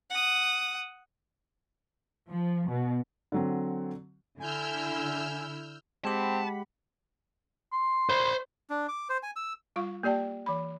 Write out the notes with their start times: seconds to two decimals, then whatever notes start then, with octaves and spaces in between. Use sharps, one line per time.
0.10 F#5 D#6
2.30 F3
2.68 B2
3.32 D3 F#3 C4
4.40 D3 E4 G#5 E6 F6 G6
6.05 G#3 C4 G4 F#5 A5 B5
7.73 C6
8.10 C5 B5
8.70 D4
8.88 D6
9.09 C5
9.23 G#5
9.36 E6
9.76 G3 F4 F5 C#6
10.03 A#3 G4 D5 G5 A5
10.46 E3 B5